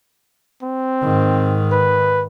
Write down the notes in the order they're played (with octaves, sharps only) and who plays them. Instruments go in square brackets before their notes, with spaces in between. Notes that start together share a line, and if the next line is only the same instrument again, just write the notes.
[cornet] C4
[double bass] G#2 D#3
[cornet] B4